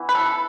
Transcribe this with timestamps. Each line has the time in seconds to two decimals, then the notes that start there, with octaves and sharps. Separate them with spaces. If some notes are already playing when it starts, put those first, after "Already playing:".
Already playing: E3 B3
0.09 B4
0.15 A4